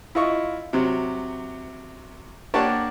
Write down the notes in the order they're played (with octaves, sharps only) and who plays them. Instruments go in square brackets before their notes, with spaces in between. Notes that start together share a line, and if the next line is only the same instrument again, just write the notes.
[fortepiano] E4 F4 D#5 C#6
C3 F#3
A#3 D4 G4 C#5 F#5 A5